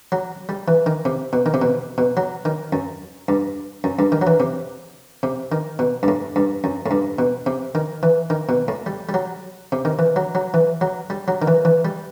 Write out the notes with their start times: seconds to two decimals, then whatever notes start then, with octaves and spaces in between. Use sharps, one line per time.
0.12 F#3
0.49 G3
0.68 E3
0.86 D#3
1.05 C3
1.33 B2
1.46 D#3
1.54 C3
1.62 B2
1.98 B2
2.17 F#3
2.45 D#3
2.73 F#2
3.28 G2
3.84 F#2
3.99 G2
4.12 D#3
4.22 F#3
4.27 E3
4.40 C3
5.23 C3
5.52 D#3
5.79 B2
6.03 G2
6.08 A2
6.36 G2
6.64 F#2
6.86 A2
6.91 G2
7.19 B2
7.46 C3
7.75 D#3
8.03 E3
8.30 D#3
8.49 B2
8.68 A2
8.86 G3
9.09 G3
9.14 F#3
9.72 C3
9.85 D#3
9.99 E3
10.16 F#3
10.35 F#3
10.54 E3
10.81 F#3
11.10 G3
11.28 F#3
11.42 D#3
11.48 E3
11.65 E3
11.85 G3